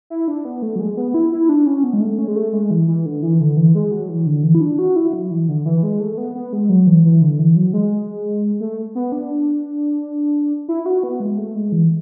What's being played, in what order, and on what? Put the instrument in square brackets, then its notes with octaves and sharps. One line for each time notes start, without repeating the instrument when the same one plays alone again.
[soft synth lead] E4
D4
B3
A3
F#3
G#3
B3
E4
E4
D4
C#4
B3
G#3
A3
C#4
G#3
A3
G#3
E3
E3
D3
E3
D3
E3
G#3
F#3
E3
D3
E3
E4
D4
F#4
E4
F#3
E3
D3
E3
G#3
A3
B3
B3
G#3
F#3
E3
E3
D3
E3
F#3
G#3
A3
B3
D4
E4
F#4
B3
G#3
A3
G#3
E3